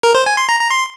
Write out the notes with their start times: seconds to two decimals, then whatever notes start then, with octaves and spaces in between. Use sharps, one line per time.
0.03 A#4
0.15 C5
0.26 G#5
0.37 C6
0.49 A#5
0.60 A#5
0.71 C6